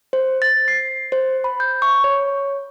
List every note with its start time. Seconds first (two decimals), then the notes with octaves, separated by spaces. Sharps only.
0.13 C5
0.42 A6
0.68 C7
1.12 C5
1.44 B5
1.60 G6
1.82 C#6
2.04 C#5